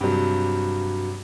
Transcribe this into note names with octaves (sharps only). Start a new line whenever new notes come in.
G2 C3 F#3